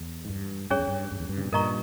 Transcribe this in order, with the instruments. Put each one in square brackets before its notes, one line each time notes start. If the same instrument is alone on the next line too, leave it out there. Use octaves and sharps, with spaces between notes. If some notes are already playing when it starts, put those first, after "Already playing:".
Already playing: [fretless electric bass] E2
G#2
G2
[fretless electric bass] G2 [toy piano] C#4 G#4 C#5
[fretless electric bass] E2
G2
G2
E2
G2
C#3
B2
[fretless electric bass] G2 A#2 [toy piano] A#4 D#5 A#5 C#6